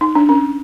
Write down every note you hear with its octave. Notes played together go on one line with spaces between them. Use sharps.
D#4
D4
C#4